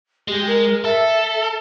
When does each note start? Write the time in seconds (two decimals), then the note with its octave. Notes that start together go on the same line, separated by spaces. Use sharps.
0.28 G#3 G4
0.47 A#4
0.85 A4 E5